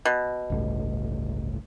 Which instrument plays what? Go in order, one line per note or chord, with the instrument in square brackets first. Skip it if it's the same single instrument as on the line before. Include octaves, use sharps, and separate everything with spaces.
[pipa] B2
[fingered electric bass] G1 C#2 A2